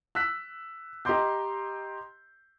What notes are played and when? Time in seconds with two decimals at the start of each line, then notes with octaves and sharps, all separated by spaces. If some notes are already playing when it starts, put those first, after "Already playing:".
0.15 E6 F#6 B6
1.05 G4 D#5 A#5 C6 D6 G6